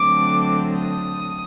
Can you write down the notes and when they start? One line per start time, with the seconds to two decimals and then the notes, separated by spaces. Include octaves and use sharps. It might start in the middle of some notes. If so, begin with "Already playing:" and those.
Already playing: D3 F#3 A3 C4 D6
0.75 D#6